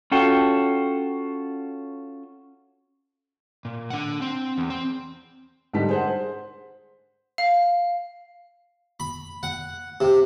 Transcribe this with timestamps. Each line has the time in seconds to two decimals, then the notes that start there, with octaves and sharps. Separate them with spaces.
0.12 C#4 F4 F#4 A4 G5
3.65 A#2
3.90 D4 F#5
4.22 C4
4.58 E2
4.70 C4
5.73 G#2 D3 G3 D#4 A5 B6
5.89 G#4 C5 F#5
6.07 C5
7.38 F5
9.00 B5
9.43 F#5
10.01 C3